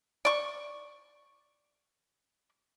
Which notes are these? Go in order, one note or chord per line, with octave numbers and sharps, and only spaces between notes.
D5 C#6